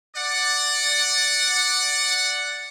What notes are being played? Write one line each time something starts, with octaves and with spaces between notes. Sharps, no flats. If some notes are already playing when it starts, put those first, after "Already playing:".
D5 F#5